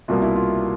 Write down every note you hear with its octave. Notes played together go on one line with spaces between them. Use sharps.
C2 B2 G3 A#3 F4
E4
F4